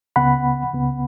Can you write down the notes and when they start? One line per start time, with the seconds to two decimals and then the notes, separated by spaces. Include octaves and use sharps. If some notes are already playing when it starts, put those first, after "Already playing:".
0.16 C#2 C#3 B3 F#5 B5
0.73 C#2 C#3 B3